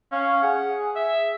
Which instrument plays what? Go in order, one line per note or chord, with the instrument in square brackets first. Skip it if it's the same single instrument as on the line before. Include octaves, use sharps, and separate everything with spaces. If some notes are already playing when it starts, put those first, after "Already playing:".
[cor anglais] C#4 [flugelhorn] F5
[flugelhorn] G#4 [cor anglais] F#5
[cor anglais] E5